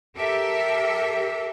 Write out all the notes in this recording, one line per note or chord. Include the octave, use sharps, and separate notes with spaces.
G4 A4 A#4 E5